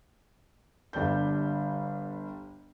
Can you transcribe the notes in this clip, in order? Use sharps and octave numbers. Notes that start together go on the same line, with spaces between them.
G1 G3 D4 G6